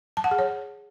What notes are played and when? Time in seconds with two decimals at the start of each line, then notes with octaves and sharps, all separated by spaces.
0.17 A5
0.24 F#5
0.31 G#4
0.39 C#5